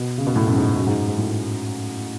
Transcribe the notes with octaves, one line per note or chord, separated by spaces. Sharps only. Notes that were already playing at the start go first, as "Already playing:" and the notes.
Already playing: B2
C#3
B2
A2
F#2
G#2
F#2
G#2
G#2
A2